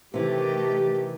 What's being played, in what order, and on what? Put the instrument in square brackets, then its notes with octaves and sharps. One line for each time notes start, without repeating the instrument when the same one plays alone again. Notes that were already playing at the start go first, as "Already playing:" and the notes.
[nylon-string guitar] C3 E3 [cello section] D#3 A3 G4